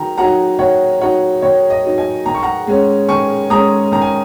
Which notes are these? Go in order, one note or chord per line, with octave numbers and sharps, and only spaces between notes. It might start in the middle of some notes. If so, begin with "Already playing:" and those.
Already playing: D#3 F#3 A#5
F#3 D#4 F#5 A#5
D#3 C#5 F#5
F#3 D#4 C#5 F#5
D#3 C#5
D#5
F#3 D#4
D#5 G#5
D#3 A#5
C#6
F#5 A#5
G#3 C#4
D#3 G#5 C#6
G#3 C#4 A#5 D#6
D#3 A#5
G#5